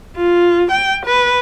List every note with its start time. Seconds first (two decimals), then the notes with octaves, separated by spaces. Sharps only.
0.17 F4
0.72 G5
1.06 B4